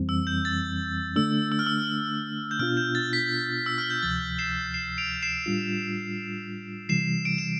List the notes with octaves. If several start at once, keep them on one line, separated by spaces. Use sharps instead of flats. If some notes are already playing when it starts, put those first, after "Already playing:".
Already playing: F2 E3 G3 C4
E6
G6
A6
D3 A3 D4 E6
E6
F6
E6
G6
B2 B3 D4 F4 F6
G6
A6
B6
E6
F6
G6
D2 C3 F3 A6
C7 E7
C7 E7
D7 F7
C7 E7
A2 G3 D4 F4
C3 E3 G3 C7 E7
D7
E7